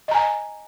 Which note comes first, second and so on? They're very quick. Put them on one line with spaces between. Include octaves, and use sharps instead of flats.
D#5 A#5 G#5